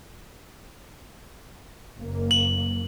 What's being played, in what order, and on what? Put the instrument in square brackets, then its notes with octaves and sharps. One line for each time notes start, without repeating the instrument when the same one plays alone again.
[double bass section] F#1 A#3
[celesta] F#7